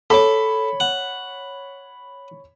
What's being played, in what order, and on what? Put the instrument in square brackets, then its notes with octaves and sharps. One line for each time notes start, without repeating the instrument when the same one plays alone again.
[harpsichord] A4 D6 [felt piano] C#5 B5
[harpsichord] F#5